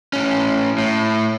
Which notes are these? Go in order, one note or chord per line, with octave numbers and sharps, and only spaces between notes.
A2 C#4
A2